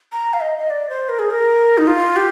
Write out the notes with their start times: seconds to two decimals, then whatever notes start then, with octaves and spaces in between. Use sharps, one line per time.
0.12 A#5
0.33 F5
0.41 D#5
0.59 D#5
0.70 D5
0.89 C5
1.09 A#4
1.19 G#4
1.30 A#4
1.78 D#4
1.87 F4
2.16 G4